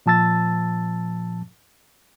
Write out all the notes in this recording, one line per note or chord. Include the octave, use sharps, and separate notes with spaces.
A#2 F3 A5 E6 A6